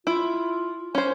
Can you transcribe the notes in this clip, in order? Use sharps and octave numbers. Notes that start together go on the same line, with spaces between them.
E4 F4
C#4 C5 G#5